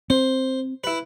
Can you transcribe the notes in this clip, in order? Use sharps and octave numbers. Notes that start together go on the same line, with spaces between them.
C4 C5
E4 B4